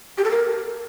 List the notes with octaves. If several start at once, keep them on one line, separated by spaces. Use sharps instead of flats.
G4
A4
A#4